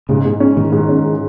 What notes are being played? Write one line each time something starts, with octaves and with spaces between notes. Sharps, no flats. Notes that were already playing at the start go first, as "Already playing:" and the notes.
G#2 C#3
G#2
C#4
G#2 D#3
G#2
C#4